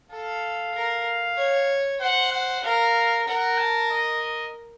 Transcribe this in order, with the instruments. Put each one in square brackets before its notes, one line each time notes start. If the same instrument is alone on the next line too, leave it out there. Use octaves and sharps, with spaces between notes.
[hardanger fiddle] A4 [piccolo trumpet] F5
[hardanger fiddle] A#4
C#5
[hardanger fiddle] C5 [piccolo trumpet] F#5
[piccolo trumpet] F#5
[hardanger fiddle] A#4 [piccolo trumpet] F5
[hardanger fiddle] A#4 [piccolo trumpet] F#5
[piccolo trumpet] A5
D#5